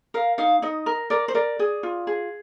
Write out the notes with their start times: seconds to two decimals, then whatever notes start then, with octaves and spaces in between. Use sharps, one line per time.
0.14 A#4 F5
0.38 D#4 F5
0.62 D#4 D#5
0.86 A#4
1.10 A#4 D5
1.28 C5
1.35 A#4 D5
1.59 G#4
1.83 F4
2.07 G#4